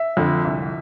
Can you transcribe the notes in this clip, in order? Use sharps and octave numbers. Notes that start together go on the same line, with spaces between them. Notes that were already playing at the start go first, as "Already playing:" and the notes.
Already playing: E5
F2 D3
C2